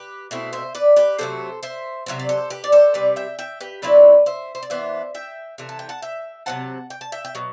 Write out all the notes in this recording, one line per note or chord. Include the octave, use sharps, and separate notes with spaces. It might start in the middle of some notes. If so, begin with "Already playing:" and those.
Already playing: G4 B4
B2 A3 C4 E4
C5 E5
B4 D5
G4 B4
C3 F#3 A3 A4 C5
C5 E5
C3 F#3 C4 E5
D5
A4 C5
G4 B4
D5
A4 C5
C3 G3 C4 B4 D5
E5 G5
E5 G5
G4 B4
D3 F#3 C4 E4 B4 D5
C5 E5
C5
D5
E3 B3 D4 C5 E5
E5 G5
C3 E3 A3
A5
G5
F#5 A5
E5 G5
C3 F#3 C4 F#5 A5
G5
A5
E5 G5
G5
B2 F#3